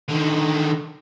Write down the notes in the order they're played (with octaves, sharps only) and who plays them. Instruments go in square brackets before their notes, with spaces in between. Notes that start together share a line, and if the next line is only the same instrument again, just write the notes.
[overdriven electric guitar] D3 D#3